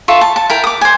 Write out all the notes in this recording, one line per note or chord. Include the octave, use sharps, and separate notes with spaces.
F4 A4 E5 C#6
A5
A5
E4 A#4 G5
D6 D#6
C5 G#5